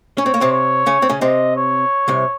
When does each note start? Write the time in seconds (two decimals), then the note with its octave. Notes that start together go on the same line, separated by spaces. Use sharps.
0.18 C#4 C#5
0.26 C4
0.34 A#3
0.41 C3 C4
0.52 C#5
0.86 C#3 C#4
1.02 C4
1.09 C#3 C#4
1.21 C3 C4 D#5
1.56 C#5
2.08 C2 C3